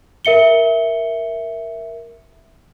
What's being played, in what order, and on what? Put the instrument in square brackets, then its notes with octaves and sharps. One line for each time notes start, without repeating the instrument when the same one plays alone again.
[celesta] A#4 E5 C#7 G7